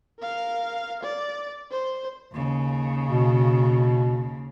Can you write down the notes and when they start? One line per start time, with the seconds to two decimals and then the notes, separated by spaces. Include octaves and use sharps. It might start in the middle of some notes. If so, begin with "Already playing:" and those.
0.19 A#4 F5
1.03 D5
1.71 C5
2.33 D#2 C#3
3.07 B2